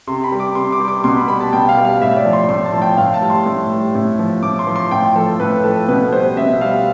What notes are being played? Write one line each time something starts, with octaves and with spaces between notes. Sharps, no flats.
C3 C6
B5
G3
D6
C3 C6
D6
G3
D6
B2 C6
B5
G3 B5
A5
B2 G5
F5
G3
F5
A2 E5
D5
F3
C6
A2 C6
A5
F3
G5
A2 F5
A5
G3
C6
A2
G3
A2
F3
A2 D6
C6
F3
C6
A2 G5
F3 A4
A2 B4
F3 A4
B2 B4
G3 C5
B2 E5
G3 F5